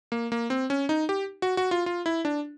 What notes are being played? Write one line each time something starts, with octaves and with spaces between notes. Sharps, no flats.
A#3
A#3
C4
C#4
D#4
G4
F#4
F#4
F4
F4
E4
D4